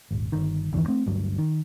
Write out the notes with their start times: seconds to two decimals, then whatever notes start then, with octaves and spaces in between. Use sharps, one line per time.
0.11 D#1 G#1
0.32 G1 D#3
0.72 G1 E2 D#3 E3
0.88 A3 C4
1.06 G1 D2 G2 F#3
1.38 D#3